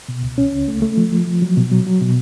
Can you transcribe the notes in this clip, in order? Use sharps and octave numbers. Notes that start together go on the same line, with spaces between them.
B2
C#2
C#4
C#2
A3
A3
F3
F3
F3
F#3
B2
F#3
F#3
B2